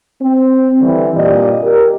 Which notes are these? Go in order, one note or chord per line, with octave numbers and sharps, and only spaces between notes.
C4
D3 E3 G3 C4
G2 A#2 G4 D5 D#5
G4 A#4